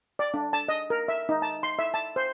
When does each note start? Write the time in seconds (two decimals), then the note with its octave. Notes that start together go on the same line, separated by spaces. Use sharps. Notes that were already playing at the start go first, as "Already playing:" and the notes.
0.19 D5
0.34 D4
0.53 A5
0.68 D#5
0.90 A#4
1.08 E5
1.29 D#4
1.42 A5
1.63 C6
1.79 E5
1.94 A5
2.16 C5